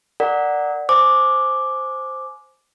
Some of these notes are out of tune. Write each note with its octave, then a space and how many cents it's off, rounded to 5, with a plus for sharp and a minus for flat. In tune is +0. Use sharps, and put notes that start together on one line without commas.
A#4 -15 D5 +5 F#5 +0
C5 +0 G#5 +30 D6 +0